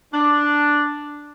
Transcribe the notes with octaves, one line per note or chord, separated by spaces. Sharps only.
D4